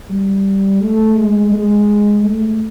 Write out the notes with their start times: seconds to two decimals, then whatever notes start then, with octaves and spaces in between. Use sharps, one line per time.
0.10 G3
0.81 A3
1.16 G#3
1.52 G#3
2.24 A3